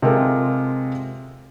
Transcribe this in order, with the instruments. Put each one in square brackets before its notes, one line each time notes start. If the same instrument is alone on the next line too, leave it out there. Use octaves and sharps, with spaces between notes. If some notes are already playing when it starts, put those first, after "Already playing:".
[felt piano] C3 G#3 F4 A4 A#4